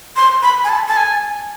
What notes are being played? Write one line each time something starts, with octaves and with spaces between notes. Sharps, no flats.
C6
B5
G#5
A5
A5
G#5